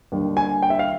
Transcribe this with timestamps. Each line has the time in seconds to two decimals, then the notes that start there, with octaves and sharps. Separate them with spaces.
0.12 D#2 D3 G3
0.37 G#5
0.63 G5
0.70 E5
0.79 F5